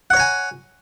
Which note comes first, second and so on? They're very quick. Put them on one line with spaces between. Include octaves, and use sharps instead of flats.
F#5 C#5 A#5 G#5